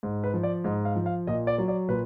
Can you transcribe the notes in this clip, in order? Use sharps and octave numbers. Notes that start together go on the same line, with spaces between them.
G#2
B4
F3
D5
G#2 D#5
F5
F3
F5
A#2 D#5
D5
F#3
D5
A#2 B4